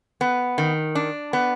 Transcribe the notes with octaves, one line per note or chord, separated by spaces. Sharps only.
B3
D#3
D4
B3